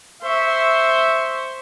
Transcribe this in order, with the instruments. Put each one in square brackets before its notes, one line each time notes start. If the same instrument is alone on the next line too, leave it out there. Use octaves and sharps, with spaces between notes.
[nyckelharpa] C5 C#6 [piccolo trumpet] E5